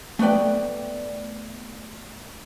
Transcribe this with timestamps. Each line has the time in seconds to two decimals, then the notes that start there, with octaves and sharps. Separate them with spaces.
0.19 A3 B3 B4 D5 G5